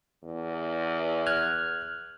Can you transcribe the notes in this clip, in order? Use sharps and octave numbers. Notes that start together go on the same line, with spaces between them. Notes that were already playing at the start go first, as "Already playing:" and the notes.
E2
F6 F#6 G#6